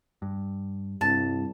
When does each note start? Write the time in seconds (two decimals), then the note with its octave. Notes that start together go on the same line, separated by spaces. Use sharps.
0.22 G2
1.01 C2 G2 A5